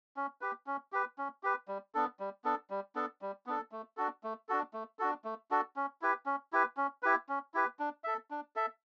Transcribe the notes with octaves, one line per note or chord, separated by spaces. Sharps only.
C#4
G4 B4
C#4
G4 B4
C#4
G4 B4
G3
B3 D4 A4
G3
B3 D4 A4
G3
B3 D4 A4
G3
B3 D4 A4
A3
D4 F#4 A4
A3
D4 F#4 A4
A3
D4 F#4 A4
A3
D4 F#4 A4
C#4
E4 G4 B4
C#4
E4 G4 B4
C#4
E4 G4 B4
C#4
E4 G4 B4
D4
A4 E5
D4
A4 E5